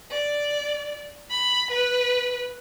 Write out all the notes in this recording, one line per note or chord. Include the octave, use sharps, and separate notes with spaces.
D5
B5
B4